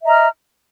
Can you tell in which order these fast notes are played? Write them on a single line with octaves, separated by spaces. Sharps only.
E5 D#5 A#5 F6